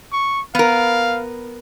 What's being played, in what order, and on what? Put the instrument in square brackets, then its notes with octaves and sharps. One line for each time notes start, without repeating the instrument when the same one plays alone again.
[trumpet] C#6
[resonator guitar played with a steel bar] B3 A#4 [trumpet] F5